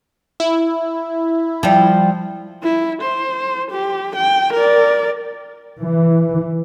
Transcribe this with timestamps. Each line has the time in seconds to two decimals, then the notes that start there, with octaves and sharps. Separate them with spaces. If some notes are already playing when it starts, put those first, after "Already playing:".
0.40 E4
1.63 F3 G3
2.63 E4
3.02 C5
3.71 G4
4.16 G5
4.53 A#4 D5
5.82 E3